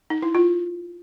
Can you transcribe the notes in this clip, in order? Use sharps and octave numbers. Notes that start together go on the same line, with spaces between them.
D#4
E4
F4